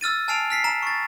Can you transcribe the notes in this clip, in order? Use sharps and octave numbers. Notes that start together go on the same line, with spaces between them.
E6 F6 A6 D#7
G#5 A5 F6 C7 D7 F7
F6 B6 C7
A#5 E7
C#6 A6